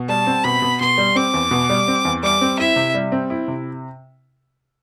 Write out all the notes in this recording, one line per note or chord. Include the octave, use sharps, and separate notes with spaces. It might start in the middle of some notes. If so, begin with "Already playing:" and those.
Already playing: B2
G3 A5
C4
B2 B5
B2
B2 C6
G3
C4 D6
E2
B2
G3
C4
E2
G3 D6
C4
E4 E5
C3
G3
C4
E4
C3